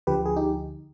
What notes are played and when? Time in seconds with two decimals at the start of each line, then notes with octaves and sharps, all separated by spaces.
0.07 D2 D3 F3 G4 B4
0.26 G#4
0.36 D#4 G4